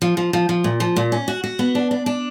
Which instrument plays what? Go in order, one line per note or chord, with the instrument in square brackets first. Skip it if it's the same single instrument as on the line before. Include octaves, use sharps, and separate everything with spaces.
[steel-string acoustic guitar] F3
F3
F3
F3
A#2
F3
A#2
C#4
F#4
F#4
B3
D4
D4
D4